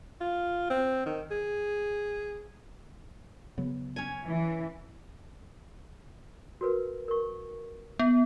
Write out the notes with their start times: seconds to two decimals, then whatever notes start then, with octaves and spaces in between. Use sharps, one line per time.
0.21 F4
0.70 C4
1.06 D#3
1.31 G#4
3.58 C#3 F#3 B3
3.96 C#4 G#5
4.27 E3
6.61 F#4 A#4 B4
7.08 A#4 C#6
7.99 B3 E5